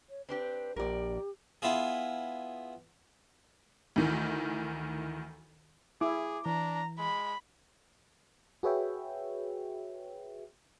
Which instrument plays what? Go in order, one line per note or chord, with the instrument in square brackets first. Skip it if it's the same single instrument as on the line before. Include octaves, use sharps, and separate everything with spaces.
[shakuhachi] C#5
[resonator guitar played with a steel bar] C4 D4 G4 [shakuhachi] B4
[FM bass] A#1 [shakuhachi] G4 [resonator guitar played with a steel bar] A#4 D5
[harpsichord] B3 E4 F4 G#4
[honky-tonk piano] D2 D#3 E3
[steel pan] E4 [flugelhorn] G#4 [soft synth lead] D6
[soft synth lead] E3 [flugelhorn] D4 [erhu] A#5
[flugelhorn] G#3 [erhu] B5
[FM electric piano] F#4 G#4 B4 C#5 E5 G5